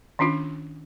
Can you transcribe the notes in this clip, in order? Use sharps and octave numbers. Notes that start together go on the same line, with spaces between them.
D#3 C#4 D4 F4